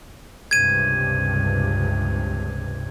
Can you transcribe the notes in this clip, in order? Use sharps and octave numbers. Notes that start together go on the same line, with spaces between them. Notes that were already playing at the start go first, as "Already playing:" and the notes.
C#2 G2 C3 G#6 D#7